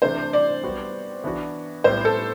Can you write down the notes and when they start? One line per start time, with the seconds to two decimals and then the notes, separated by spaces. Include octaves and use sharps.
0.02 C3 E3 A3 D4 C5
0.33 D5
0.63 G3 B3 F#4 C5
1.24 E3 B3 D4 F#4
1.84 A2 G3 B3 C5
2.05 A4